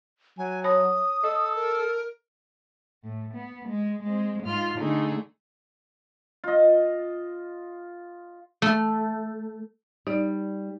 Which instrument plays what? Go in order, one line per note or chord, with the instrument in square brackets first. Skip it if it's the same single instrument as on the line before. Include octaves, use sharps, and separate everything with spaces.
[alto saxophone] F#3 [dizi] G#5
[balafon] C#5 A5 B5 [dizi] D#6
[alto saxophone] A4 [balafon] D#5
[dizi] A#4
[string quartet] A2
B3
G#3
G#3 C4
G#2 F4 F6
D3 A3 D#4 G#4
[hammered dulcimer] F4 D#5
[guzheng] A3
[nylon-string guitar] G3 [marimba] D#4 D5